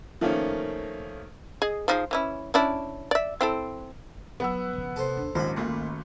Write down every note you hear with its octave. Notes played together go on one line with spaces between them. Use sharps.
D#3 F3 A3 A#3 C#4
G#4 D#5
F3 D#4 G#4
E3 C#4 E4
C#4 D4 E4
D5 E5
C4 E4 A4
F#3 B3 F#5 E6
C#3 F3
C3 A4 C5
D#2 D4
A#1 D#2 G#2 D#3 C#4 C5 B5
G#1 A#2 A3